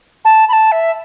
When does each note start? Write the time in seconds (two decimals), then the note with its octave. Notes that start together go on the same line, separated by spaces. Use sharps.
0.25 A5
0.49 B5
0.53 A5
0.72 E5